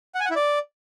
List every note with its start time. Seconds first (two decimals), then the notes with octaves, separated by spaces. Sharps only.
0.15 F#5
0.20 G#5
0.25 F#5
0.30 E4
0.36 D5